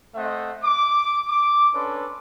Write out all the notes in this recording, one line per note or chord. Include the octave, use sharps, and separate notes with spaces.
A3 C4 C5 D#5 E5 F#5
D6
D6
C#4 D4 A4 B4 C#5 C6